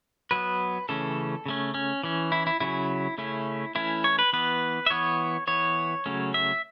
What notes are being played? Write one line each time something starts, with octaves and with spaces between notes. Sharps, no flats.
F#3 B3 B4
C#3 E3 A3 C#4 A4
C#3 A3 C#4
C#4
E3 C#4
E4
E4
C#3 F#3 C#4 E4
C#3 A3 C#4 E4
E3 A3 C#4 E4
C#5
B4
E3 B3 B4
E5
E3 B3 C#5
E3 B3 C#5
C#3 F#3 A3 C#4
E5